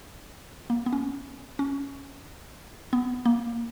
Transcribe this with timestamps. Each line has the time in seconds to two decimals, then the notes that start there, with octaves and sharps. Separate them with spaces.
0.70 A#3
0.86 B3
0.93 C#4
1.59 C#4
2.93 B3
3.26 A#3